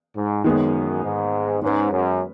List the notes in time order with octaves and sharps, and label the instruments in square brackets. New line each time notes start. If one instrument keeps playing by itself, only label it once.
[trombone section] G#2
[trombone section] F#2 [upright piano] D#3 G#3 B3 G#4
[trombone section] G#2
[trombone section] G#2 [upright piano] G#3 C#4 B4
[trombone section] F#2